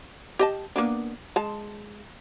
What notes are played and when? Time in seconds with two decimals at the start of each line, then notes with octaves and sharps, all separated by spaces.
0.39 G4 D#5 A5
0.76 A#3 B3 D4
1.36 G#3 A5